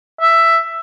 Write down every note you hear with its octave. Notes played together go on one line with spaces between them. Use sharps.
E5